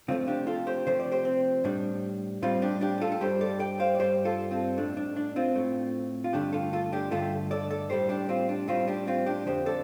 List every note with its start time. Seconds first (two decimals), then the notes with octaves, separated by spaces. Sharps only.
0.08 C3 F3 A3 C4 F4
0.27 D4 G4
0.47 F4 A4
0.67 G4 C5
0.87 C3 F3 A3 C5
1.00 D5
1.12 G4 C5
1.25 C4
1.64 A2 G3 D4
2.42 A2 G3 C4 F4
2.62 D4 G4
2.81 D4 G4
2.98 G4
3.01 F4 A4
3.12 A4
3.20 G2 G3 G4 C5
3.41 A4 D5
3.60 D5 G5
3.79 C5 F5
3.95 D5
3.99 G2 G3 G4 C5
4.25 F4 A4
4.51 C4 F4
4.77 A2 A3 D4
4.97 D4
5.16 D4
5.36 C4 F4
5.56 A2 A3
6.24 F4
6.33 G2 D3 A3 D4 G4
6.53 F4 A4
6.73 F4 A4
6.92 D4 G4
7.11 G2 D3 A3 F4 A4
7.51 A4 D5
7.70 A4 D5
7.90 A2 G3 G4 C5
8.09 D4 G4
8.29 C4 F4
8.49 D4
8.68 A2 G3 C4 F4
8.88 D4 G4
9.07 C4 F4
9.26 D4 G4
9.46 F2 D3 F3 G4 C5
9.66 A4 D5